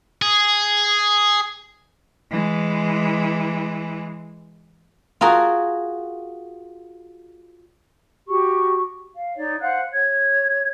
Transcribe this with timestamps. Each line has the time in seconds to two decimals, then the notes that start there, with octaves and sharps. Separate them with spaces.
0.22 G#4
2.31 E3 G#3
5.21 F4 F#4 G#4 A#4
8.28 F#4 G4 C#6
9.14 F5
9.36 D#4 C#5 D5
9.61 C5 F5 F#5 F#6
9.92 C#5 G#6